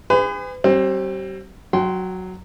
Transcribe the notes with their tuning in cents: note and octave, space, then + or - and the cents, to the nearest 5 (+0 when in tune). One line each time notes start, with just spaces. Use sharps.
G#4 -35 B4 +40
G3 -35 C4 +25
F#3 +0 G5 -30 C6 +0